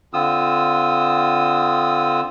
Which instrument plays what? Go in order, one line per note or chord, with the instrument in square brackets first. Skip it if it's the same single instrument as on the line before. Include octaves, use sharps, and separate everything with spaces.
[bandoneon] D3 C4 F4 D#6 E6